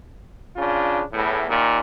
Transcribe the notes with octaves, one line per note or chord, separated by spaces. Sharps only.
C#3 D4 F4
E2 A2
D#2 A#2